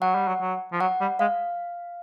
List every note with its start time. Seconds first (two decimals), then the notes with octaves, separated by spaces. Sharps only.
0.02 F#3 F#5
0.15 G3
0.28 F#3
0.42 F#3
0.72 F3
0.80 F#3 F#5
1.01 G3
1.19 G#3 F5